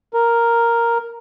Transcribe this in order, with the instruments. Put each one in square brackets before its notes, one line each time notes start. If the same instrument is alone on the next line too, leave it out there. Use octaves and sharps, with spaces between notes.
[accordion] A#4